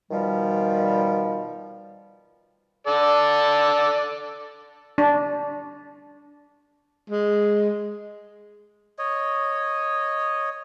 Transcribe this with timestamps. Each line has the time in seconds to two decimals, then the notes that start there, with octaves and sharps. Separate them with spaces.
0.11 B2 D#3 F3 G3
2.87 A4 D5
4.98 D4
7.10 G#3
8.99 C#5 D#5